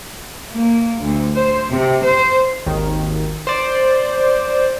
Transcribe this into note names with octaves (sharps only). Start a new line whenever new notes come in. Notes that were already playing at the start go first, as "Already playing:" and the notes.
A#3
D2
C5
C3
C5
G#1 D#2 D#3
C5 D5